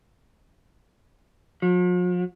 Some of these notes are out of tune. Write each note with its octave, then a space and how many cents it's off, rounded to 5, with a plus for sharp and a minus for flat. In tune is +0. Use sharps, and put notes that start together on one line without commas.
F3 +45